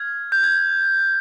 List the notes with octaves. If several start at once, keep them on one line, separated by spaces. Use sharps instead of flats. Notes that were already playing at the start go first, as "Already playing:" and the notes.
Already playing: F6 G#6
G6
G#6